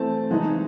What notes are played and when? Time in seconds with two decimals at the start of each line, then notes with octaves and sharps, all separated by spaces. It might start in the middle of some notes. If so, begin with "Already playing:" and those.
Already playing: E3 A3 C4 A5
0.31 E3 G#3 D#4